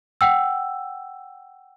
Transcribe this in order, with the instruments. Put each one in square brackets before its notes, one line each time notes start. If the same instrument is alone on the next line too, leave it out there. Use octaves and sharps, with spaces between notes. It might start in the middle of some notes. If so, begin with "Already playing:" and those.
[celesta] F#5 G5 E6